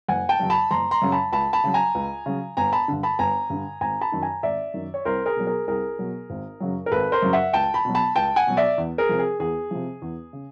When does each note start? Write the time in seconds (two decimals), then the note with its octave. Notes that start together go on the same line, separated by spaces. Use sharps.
0.08 F#1 F#5 G#5
0.29 G5 A5
0.39 F#2 C#3 F#3
0.50 A5 B5
0.71 F#1 A#5 C6
0.91 A#5 C6
1.02 F#2 C#3 F#3
1.12 A5 B5
1.32 C#2 A5 B5
1.53 A5 B5
1.64 C#3 F#3
1.74 G#5 A#5
1.95 C#2
2.26 C#3 F#3
2.57 G1 G#5 A#5
2.73 A5 B5
2.88 G2 D3
3.03 A5 B5
3.19 G1 G#5 A#5
3.50 G2 D3
3.81 G#1 G#5 A#5
4.01 A5 B5
4.12 F#2 D#3
4.23 G#5 A#5
4.43 G#1 D5 E5
4.74 F#2 D#3
4.94 C#5
5.05 C2 A#4 C5
5.26 G#4 A#4
5.37 B2 F#3
5.47 G#4 A#4
5.68 C2 G#4 A#4
5.99 B2 F#3
6.30 G#1
6.60 F#2 C#3 F#3
6.86 A#4
6.92 G#1 A4 B4
7.12 A#4 C5
7.22 F#2 C#3 F#3
7.33 E5 F#5
7.53 C#2 G5 A5
7.74 A5 B5
7.85 B2 F#3
7.95 A5 B5
8.16 C#2 G5 A5
8.36 F#5 G#5
8.47 B2 F#3
8.57 D5 E5
8.78 E2
8.98 G#4 A#4
9.09 C3 F3
9.19 G#4
9.40 E2 G#4
9.71 C3 F3
10.02 E2
10.33 C#3